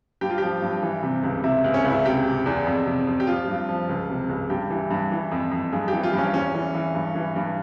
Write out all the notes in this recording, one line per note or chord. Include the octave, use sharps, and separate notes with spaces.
G2 G4
F4
F3 G4
G2
E3
C3
C#2
C3 E4
C#2
C#4
C#2
E4
C3 G4
C3
E2
F2
C3
F2
G4
F3 F4
G2
F3
C#2
C3
C#2
G2 G4
E3
G2
E3
F2
F2
G2 G#4
G4
E3
F4
G2
C#4
E2 C#4
E3
E3
G2
E3
G2